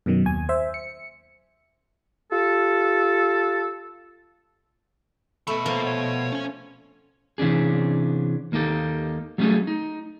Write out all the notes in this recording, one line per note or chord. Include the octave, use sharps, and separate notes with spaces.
F#2 B2 D#3 F#3
D#2 G#5
C5 E5
C#7
F4 G4 A4
B2 A3 B5
F3 A#4 F5
C#5
C#4 C#5
C3 E3 C#4 D4 G#4
D#2 A#3 D#4 G4 A4
F#3 G3 A3 C#4 G#4 A4
D#4